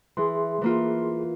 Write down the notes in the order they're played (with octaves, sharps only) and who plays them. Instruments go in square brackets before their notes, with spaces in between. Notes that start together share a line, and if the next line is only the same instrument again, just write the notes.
[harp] E3 [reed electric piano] G#4 C6
[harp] E3 A#3 F4